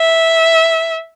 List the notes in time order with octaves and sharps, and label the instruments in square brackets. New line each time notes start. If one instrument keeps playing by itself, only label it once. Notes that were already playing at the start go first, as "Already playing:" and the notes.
Already playing: [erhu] E5